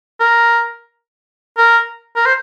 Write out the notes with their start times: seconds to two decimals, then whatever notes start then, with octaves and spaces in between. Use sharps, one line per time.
0.20 A#4
1.58 A#4
2.16 A#4
2.26 C5